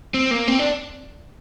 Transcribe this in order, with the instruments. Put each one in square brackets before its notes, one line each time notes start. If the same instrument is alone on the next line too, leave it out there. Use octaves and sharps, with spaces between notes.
[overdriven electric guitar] C4
A#3
C4
D4